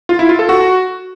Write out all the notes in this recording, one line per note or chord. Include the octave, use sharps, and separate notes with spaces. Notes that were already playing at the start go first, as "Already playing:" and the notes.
F4
E4
F4
A4
F#4